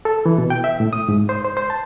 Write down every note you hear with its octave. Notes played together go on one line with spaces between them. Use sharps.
A4
E3
B2
G5
E5
A2
D#6
G#2
C5
C5
C5
A5